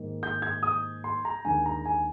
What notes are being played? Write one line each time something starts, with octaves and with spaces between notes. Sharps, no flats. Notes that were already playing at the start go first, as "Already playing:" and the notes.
Already playing: G#2 D#3 A#3
G6
G#6
D#6
C6
A#5
D#2 D3 G#3 G#5
A#5
G#5